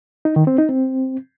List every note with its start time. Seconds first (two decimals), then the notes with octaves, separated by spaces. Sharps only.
0.25 D#4
0.36 D#3
0.47 C4
0.58 D#4
0.69 C4